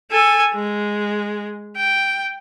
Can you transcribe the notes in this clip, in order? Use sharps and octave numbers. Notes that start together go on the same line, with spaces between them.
A4 G#5
G#3
G5